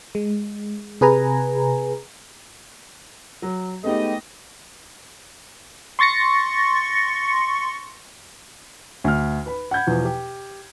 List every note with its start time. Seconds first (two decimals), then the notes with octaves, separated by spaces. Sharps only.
0.15 G#3
1.01 C3 G#4 B4 G#5 A#5
3.42 F#3
3.84 G#3 A3 B3 D#4 G4 D#5
5.99 C6 C#6 A6 A#6 C#7
9.04 D2 F6
9.46 B4 B5
9.71 F#5 B5 G6 G#6
9.87 E2 B2 F3
10.05 G4